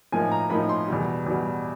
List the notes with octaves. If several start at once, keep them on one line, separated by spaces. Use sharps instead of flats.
A2 F3 A#3 D#4 G#5
A#5
A2 F3 A#3 D#4 B5
C6
E2 B2 G3
E2 B2 G3